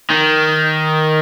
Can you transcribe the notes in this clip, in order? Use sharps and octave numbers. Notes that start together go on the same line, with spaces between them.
D#3